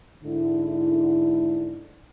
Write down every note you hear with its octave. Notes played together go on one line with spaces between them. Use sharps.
G#2 D3 E4